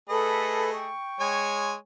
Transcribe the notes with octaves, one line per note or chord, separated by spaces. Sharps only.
A3 G#4 A4 B4 D#5 B5
G5 C#6
G#3 C#5 G#5